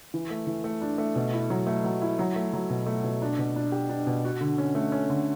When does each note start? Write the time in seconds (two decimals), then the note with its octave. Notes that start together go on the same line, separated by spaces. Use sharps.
0.14 E3
0.31 A3
0.47 E3
0.64 A3
0.81 D4
0.98 A3
1.16 B2
1.33 E4
1.50 F#3
1.67 A3
1.84 F#3
2.02 E4
2.19 F#3
2.36 A3
2.53 F#3
2.70 B2
2.87 A3
3.04 B2
3.22 D4
3.39 B2
3.56 D4
3.72 G4
3.89 D4
4.07 B2
4.25 F#4
4.41 D3
4.58 C#4
4.75 A3
4.92 C#4
5.10 D3